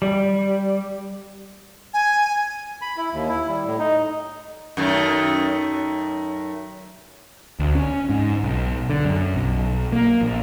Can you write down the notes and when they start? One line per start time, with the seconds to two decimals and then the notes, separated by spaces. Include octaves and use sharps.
0.02 G3
1.94 G#5
2.82 B5
2.97 E4
3.13 D#2
3.29 E4
3.49 G3
3.66 A2
3.79 D#4
4.77 F#2 D#3 A3
7.60 D2
7.75 C#4
8.09 G#2
8.43 B1
8.90 D3
9.05 F#2
9.36 B1
9.92 A#3
10.21 A#1